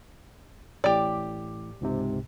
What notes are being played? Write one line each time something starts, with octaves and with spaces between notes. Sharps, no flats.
A1 A2 G4 D5
C#2 G#2 C3